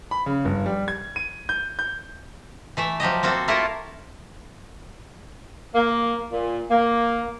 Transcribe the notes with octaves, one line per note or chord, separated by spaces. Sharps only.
B5
C#3
G1
G3
G#6
D#7
G6
G6
E3 A3 E5
F3 F#3 G4 D#5
A#3 C4 F#4 A4
A3 A#3 E4 F4 A4 A#4
A#3
A#2
A#3